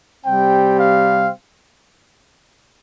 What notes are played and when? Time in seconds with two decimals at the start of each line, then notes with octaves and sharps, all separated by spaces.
0.25 C3 G3 C4 G5
0.79 F5